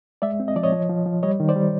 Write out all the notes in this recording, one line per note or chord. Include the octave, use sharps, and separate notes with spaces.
G#3 D5 E5
C4
D#5
F3 D5
C#5 D#5
F3
F3
F3
G3 C#5 D#5
D#3
C5 D5
G3